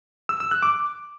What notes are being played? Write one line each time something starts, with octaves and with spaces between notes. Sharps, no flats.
E6
E6
F#6
D6